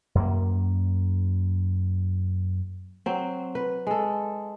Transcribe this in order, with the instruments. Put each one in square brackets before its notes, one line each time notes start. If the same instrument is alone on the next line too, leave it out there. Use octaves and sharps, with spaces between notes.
[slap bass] F#2 A#3
[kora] F#3 C4
B4
G#3 A4